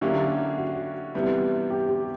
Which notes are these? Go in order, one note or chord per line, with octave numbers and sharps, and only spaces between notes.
D3 F#3 A#3 C#4 E4 G4
F#4
C3 E3 G3 B3 E4
G4
G4